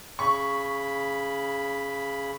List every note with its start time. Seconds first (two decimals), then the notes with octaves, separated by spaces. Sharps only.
0.19 C#3 B5 C#6